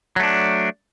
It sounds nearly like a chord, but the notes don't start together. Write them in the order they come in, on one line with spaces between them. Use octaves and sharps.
F#3 A3 D4